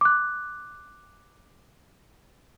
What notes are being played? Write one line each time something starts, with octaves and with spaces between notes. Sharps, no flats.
D6 F#6